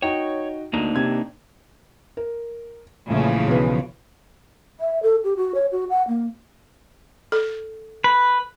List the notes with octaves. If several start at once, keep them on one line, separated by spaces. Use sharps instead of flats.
D#4 F#4 C#5 G5
D2 A#3 D4 D#4
C3 C4 G#6
A#4
A#1 C#3 E3 F3 A3
B1 B4
E5
A4
G4
F#4
C#5
F#4
F#5
A#3
A4
B4